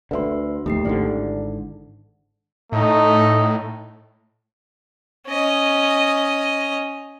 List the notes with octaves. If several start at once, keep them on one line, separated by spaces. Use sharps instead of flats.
D2 D3 B4 E5 C6
A#1 D#2 A3 G4 C7
G#1 G#2 D3 E4 D5
A2 A3 D#4
C#4 D#5